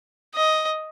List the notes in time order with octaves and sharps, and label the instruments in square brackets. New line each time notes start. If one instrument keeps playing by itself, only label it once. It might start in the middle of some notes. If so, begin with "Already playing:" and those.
[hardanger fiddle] D#5